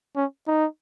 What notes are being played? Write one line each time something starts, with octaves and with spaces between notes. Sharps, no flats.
C#4
D#4